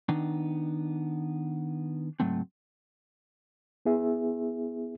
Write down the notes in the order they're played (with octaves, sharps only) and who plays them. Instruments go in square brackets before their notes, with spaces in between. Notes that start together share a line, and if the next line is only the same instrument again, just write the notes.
[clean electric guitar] D#3 B3 D4 D#4
C#2 G#2 F#3 A3 C4
[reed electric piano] B3 E4 G#4 E5